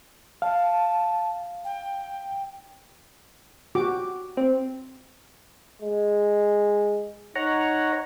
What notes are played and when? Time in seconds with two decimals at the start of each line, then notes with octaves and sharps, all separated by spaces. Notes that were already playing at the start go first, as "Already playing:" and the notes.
0.42 F5 A5
1.65 G5
3.75 F#4 G4 D6
4.37 C4
5.82 G#3
7.36 D#4 C#5 F#5 A#5